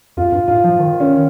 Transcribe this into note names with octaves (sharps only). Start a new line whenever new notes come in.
F2 F4
G2
G#2 F4
F3
D#3
C#4